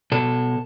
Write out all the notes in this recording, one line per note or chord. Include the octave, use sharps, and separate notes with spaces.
B2 A4